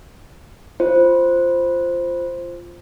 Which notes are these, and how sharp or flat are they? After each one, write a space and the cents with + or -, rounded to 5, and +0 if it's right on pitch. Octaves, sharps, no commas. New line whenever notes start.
F4 -5 C5 +0